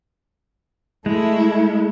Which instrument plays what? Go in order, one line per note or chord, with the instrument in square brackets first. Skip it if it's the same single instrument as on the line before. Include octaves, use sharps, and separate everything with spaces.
[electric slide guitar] G#3 [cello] A3 E4